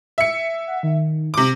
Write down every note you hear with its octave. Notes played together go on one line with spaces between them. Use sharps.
E5 C#7
F#5
D#3
C3 D6